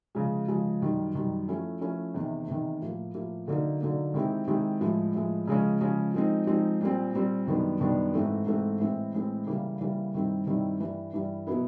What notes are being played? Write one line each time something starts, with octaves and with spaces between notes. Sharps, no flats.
C#3 F3 G#3
C#3 F3 G#3
F#2 D#3 G3
F#2 D#3 G3
F3 A3 C#4 E4
F3 A3 C#4 E4
E2 C3 D#3
E2 C3 D#3
A2 F3 A#3
A2 F3 A#3
D3 F#3 A#3 D#4
D3 F#3 A#3 D#4
D#3 G#3 C4 E4 G4
D#3 G#3 C4 E4 G4
A2 F3 G#3
A2 F3 G#3
C#3 F3 G#3 C#4
C#3 F3 G#3 C#4
F3 G#3 C4 D#4
F3 G#3 C4 D#4
A#2 G3 C4
A#2 G3 C4
F#2 D#3 G3 B3 D4
F#2 D#3 G3 B3 D4
G#2 E3 A3 C4
G#2 E3 A3 C4
A2 E3 G#3 C4
A2 E3 G#3 C4
C#3 E3 G3 A#3
C#3 E3 G3 A#3
G2 D#3 G3 C4 E4
G2 D#3 G3 C4 E4
G2 E3 G3
G2 E3 G3
B2 F#3 B3 E4